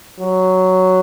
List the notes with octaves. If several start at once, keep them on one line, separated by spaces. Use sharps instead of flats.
F#3